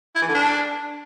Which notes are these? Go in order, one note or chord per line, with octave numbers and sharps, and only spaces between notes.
E4
E3
D3
D4